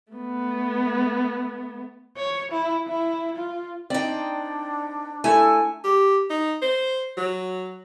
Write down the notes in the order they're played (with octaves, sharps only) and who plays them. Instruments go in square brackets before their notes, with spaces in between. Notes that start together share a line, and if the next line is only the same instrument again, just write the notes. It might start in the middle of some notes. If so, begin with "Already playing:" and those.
[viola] A3 B3
[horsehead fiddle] C#5
E4
E4
F4
[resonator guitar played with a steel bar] C4 D#4 [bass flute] D4 [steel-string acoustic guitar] D5 G5
[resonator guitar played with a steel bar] A3 E4 A4 [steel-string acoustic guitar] G#5
[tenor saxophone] G4
D#4
C5
F#3